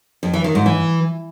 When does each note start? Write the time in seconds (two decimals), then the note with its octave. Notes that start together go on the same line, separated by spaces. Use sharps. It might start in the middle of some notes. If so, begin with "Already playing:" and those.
0.23 F2
0.34 E3
0.44 D#3
0.55 G#2
0.66 E3